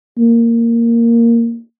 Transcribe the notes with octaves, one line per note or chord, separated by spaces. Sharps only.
A#3